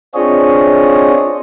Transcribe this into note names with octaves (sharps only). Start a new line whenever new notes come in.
C4 D4 F4 G#4 C#5 D#5